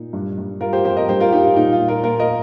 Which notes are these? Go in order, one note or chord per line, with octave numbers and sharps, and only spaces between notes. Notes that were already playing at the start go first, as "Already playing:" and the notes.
Already playing: A#2 D#4
G2
G2
G3 F4 A#4
G4 C5
F2 G4 C5
A#4 D#5
G2 G4 C5
F4 A#4
G3 D#4 G4
F4
A#2 D#4
F4
A#2
F4 A#4
A#2 F4 A#4
A#4 D#5